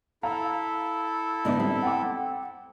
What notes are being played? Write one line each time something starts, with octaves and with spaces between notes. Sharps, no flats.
E4 A4 F5 A#5
G#2 D3 B3 D#4 D5 E5
G3 C4
F#5 G5 D6